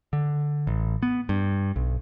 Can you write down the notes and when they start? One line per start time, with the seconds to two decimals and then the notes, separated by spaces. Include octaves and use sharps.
0.13 D3
0.67 A1
1.03 B3
1.29 G2
1.76 B1